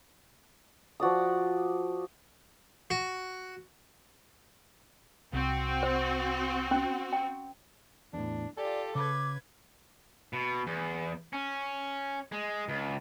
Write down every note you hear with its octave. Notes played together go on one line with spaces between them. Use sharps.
F3 F#4 D5 D#6
F#4
C2 C4 F#4
C5
C#4
G5
E2 A2 D4
F4 G4 A4 D5 G#5
C#3 B4 D6 G#6
B2
E2
C#4
G#3
C#2